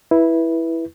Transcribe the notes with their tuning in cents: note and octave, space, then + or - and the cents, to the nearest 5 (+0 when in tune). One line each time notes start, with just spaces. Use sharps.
E4 +0 B4 -15